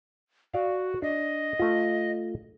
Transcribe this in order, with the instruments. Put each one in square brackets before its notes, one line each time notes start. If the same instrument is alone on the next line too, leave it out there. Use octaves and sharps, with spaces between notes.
[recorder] F#4 [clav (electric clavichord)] D5 F5
[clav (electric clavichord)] D4 [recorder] D#5
[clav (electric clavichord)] A3 F4